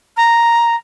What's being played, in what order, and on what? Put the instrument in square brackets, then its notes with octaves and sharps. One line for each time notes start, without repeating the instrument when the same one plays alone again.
[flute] A#5